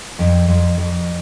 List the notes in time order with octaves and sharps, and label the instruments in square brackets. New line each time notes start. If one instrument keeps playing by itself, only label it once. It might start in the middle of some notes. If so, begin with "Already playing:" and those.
[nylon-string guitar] F2
F2
F2